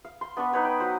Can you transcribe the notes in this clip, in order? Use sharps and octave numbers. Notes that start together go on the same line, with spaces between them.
F5
C6
B3 D4 B4 C#6
D#4 B4 C#5 B5
G5
F#3 C5